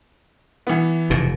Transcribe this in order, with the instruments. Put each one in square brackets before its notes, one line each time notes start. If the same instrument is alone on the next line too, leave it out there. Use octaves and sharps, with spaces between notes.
[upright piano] E3 B3
[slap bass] F1 G#2 B2